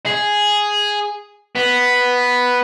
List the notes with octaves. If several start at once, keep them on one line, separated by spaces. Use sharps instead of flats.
G#4
B3